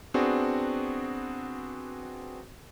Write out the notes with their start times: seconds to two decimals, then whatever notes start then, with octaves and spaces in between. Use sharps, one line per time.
0.14 B3 C4 D4 F#4 G#4